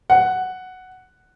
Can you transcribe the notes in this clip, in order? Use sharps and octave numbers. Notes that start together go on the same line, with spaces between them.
F#5